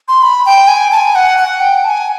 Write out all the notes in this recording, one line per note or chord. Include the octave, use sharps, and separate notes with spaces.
C6
B5
G5
G#5
A5
G#5
F#5
F#5
G5
A5
G#5